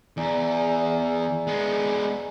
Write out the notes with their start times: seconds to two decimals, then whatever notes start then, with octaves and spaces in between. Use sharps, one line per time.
0.17 E2 D5 G#5 A#5
1.47 G#3 B3